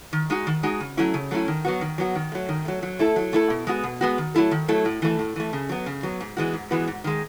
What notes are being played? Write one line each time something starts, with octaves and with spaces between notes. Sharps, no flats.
D#3
G#3 D#4 F#4
D#3
G#3 D#4 F#4
C#3
F#3 A3 C#4 E4
C#3
F#3 A3 C#4 E4
D#3
F#3 B3 F#4
D#3
F#3 B3 F#4
D#3
F#3 A3
D#3
F#3 A3
F#3
A3 E4 A4
F#3
A3 E4 A4
B2
G#3 B3 F#4
B2
G#3 B3 F#4
D#3
F#3 A3 E4 A4
D#3
F#3 A3 E4 A4
A2
E3 A3
A2
E3 A3
C#3
F#3 B3
C#3
F#3 B3
G#2
E3 G#3 B3 F#4
G#2
E3 G#3 B3 F#4
G#2
D#3 G#3